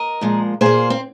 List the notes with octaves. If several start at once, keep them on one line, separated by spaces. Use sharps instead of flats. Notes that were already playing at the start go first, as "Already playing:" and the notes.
Already playing: A#4 D#5
A#2 F3 G#3
A#2 A#3 G#4 C5
C4